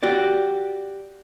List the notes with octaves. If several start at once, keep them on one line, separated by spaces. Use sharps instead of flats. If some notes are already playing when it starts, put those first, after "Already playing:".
F#4 G4 D5